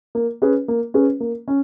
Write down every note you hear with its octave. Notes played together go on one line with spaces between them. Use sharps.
A#3
C#4 G#4 B4
A#3
C#4 G#4 B4
A#3
C#4